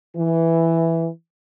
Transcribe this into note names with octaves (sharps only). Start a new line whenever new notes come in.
E3